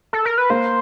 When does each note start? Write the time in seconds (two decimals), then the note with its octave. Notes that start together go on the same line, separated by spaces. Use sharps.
0.13 A4
0.25 A#4
0.38 B4
0.50 A#3 C5